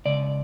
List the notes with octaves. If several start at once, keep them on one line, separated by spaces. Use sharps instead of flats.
C#2 C#3 D5